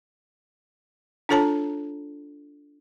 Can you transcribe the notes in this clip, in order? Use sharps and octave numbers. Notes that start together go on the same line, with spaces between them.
D4 F4 A4 C#5 A5 A#5